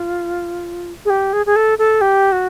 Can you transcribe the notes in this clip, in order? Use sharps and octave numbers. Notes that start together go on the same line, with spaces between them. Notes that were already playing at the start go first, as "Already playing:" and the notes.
Already playing: F4
G#4
G4
G#4
G#4
A4
A4
G4
F#4